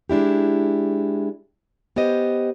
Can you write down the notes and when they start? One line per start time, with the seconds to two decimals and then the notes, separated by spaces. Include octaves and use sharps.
0.09 G#3 D4 E4 G4
1.96 B3 G4 C5 D#5